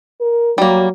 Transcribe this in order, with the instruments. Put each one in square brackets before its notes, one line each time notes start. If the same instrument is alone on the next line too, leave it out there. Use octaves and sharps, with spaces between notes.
[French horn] A#4
[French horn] F#3 [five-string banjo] G3 A#3